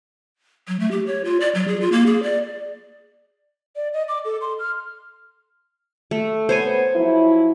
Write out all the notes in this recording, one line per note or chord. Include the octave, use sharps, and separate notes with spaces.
F#3
A3
G4
C#5
F4
D5
F#3
G#4
F4
A#3
G#4
D5
D5
D#5
D6
A4
C6
F6
A3
B3 C5 C#5 G#5
F3 F#3 E4